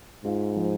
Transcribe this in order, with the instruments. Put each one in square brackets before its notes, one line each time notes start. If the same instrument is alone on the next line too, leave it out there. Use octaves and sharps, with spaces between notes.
[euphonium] G#2 [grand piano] F4
[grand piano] F3